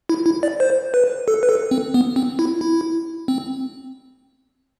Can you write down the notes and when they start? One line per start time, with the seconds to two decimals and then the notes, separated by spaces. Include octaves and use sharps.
0.09 E4
0.26 E4
0.43 D5
0.60 C5
0.94 B4
1.28 A4
1.43 B4
1.49 A4
1.71 C4
1.94 B3
2.16 C4
2.39 E4
2.61 E4
3.28 C4